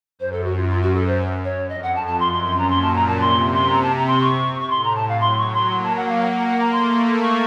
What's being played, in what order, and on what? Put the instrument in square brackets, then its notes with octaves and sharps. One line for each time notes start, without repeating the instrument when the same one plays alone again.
[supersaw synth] F#2 [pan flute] C5
[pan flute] A4
F#4
F4
F4
F#4
A4
C5
C#5
[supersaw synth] F2 [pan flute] D#5
[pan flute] F#5
A5
A5
[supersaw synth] F#2 [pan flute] C6
[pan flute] C6
C6
A#5
[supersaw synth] A#2 [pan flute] C6
[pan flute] A5
A#5
A5
[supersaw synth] C3 [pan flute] C6
[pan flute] C6
A#5
A5
A#5
C6
C#6
C#6
[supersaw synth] A2 [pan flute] C6
[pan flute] A#5
A5
F5
[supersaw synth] F#3 [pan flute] C6
[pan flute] C#6
C6
[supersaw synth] A#3
[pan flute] A5
F#5
F5
[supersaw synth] A#3 [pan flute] F#5
[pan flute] F#5
F#5
A#5
[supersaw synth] A3 [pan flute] C6
[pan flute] C#6